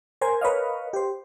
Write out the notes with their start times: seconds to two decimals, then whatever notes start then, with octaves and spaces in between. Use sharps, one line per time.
0.21 A#4 C5 G#5
0.41 A#4 B4 C#5 D#5 F5
0.93 G4 C5